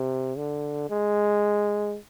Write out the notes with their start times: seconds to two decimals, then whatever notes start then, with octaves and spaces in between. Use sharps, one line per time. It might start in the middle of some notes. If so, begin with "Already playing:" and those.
Already playing: C3
0.37 D3
0.90 G#3